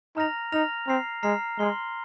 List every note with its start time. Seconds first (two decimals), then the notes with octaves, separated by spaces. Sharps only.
0.16 D#4 A#5 F6 A#6 F7
0.52 D#4 A#5 F6 A#6 F7
0.88 C4 A#5 F6 C7
1.23 G#3 A#5 F6 C7
1.59 G#3 C6 F6 C7 G7